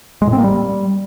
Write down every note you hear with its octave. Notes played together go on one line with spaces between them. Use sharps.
G#3
A2
C4
A#3
G3